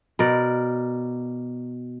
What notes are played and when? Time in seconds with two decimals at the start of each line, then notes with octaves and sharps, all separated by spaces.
0.19 B2 A#4 D5